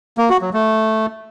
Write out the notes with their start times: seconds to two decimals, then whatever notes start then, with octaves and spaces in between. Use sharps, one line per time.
0.18 A#3
0.30 F#4
0.42 F#3
0.53 A3